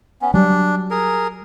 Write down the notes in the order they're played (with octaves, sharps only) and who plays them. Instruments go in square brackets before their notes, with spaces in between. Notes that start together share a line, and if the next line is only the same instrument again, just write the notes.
[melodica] B3 C#4
[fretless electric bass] F#3 G3 [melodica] D4
[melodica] G#4 A#4